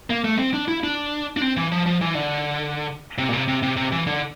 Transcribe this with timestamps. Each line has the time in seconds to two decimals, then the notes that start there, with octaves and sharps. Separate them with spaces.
0.10 A#3
0.24 A3
0.38 C4
0.54 D4
0.68 E4
0.84 D4
1.37 D4
1.42 C4
1.57 E3
1.72 F3
1.86 F3
2.01 E3
2.15 D3
3.18 C3
3.29 A#2
3.33 C3
3.48 C3
3.63 C3
3.76 C3
3.92 E3
4.07 D3